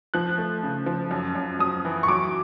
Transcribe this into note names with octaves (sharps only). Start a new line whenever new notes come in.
F3 F#6
A3
C#3
F3
F#2
F#2
F#2 D#6
E3
C#6
F#3 D6